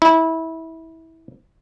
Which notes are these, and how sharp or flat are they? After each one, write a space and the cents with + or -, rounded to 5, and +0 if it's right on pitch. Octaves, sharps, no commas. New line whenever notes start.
E4 -20